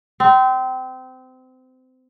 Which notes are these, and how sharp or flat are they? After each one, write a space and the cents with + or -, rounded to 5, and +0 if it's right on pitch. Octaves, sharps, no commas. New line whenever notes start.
C4 -25